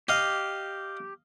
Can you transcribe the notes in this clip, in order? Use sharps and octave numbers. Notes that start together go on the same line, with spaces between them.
G4 D#5 F5